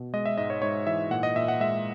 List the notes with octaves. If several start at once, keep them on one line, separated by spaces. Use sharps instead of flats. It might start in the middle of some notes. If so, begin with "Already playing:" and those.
Already playing: B2
G#3 D#5
E5
G#2 D#5
C#5
G#2 C#5
E3 E5
A#2 F#5
D#5
A#2 E5
F#5
G#3 E5